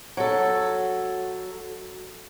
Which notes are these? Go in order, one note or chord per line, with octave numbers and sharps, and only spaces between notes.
F#3 A4